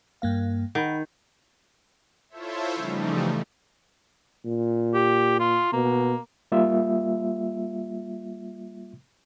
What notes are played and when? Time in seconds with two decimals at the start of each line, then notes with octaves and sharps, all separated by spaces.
0.22 G2 A#3 F5
0.75 D#3 F#5 B5
2.29 E4 F4 A4 C5 C#5 E5
2.75 C#3 E3 F3 G3 A3 D#4
4.45 A#2
4.94 G4
5.40 F4
5.73 B2 A#3
6.52 G3 A#3 F4 E5